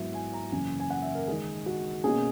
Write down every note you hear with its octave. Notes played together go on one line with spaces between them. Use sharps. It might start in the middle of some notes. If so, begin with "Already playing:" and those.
Already playing: G#2 F#3 B3 E4 E5
G#5
A#5
F#2 C#3 E3 A#3 C#4 G#5
G#5
F#5
E5
A#4
D#3 G#3 D#4 G#4
F#4
B2 A#3 C#4 G#4